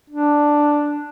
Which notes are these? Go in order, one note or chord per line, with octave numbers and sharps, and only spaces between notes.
D4